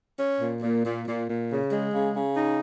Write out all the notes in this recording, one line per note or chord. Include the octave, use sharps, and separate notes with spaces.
C#4
A#2
A#2
A#2
A#2
A#2
C#3
G#3
C#3
C#3
D#4